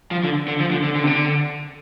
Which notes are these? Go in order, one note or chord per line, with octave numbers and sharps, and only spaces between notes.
F3
D3
D3
F3
D3
D3
D3
C3
D3